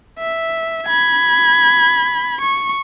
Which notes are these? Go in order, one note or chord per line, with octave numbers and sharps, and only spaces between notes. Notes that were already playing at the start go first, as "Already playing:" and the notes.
E5
B5 G#6
C#6